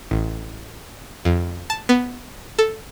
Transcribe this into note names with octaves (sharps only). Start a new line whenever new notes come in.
A1
F2
A5
B3
A4